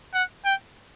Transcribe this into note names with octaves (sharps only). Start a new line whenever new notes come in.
F#5
G5